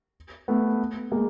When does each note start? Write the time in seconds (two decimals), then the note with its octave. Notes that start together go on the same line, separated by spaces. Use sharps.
0.48 A3 B3
1.12 G#3 A#3